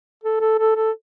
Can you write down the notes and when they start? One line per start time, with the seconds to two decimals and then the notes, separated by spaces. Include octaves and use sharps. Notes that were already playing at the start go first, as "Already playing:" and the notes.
0.24 A4
0.41 A4
0.59 A4
0.76 A4